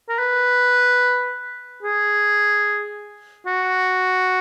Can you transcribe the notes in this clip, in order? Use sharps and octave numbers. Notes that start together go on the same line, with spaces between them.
A#4
B4
G#4
F#4